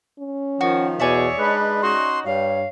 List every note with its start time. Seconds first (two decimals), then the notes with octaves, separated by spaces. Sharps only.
0.19 C#4
0.61 D#3 F3 F#4
1.00 E2 B2 G#4 C#5 D5 E5
1.39 G#3 D4 D#4 B4
1.82 C#4 D#4 F#4 C6
2.25 G2 C#5 F5